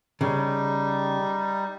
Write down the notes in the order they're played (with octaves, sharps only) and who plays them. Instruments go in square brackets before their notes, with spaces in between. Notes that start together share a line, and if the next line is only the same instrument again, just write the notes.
[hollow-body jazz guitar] C#3 [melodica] G3 D#4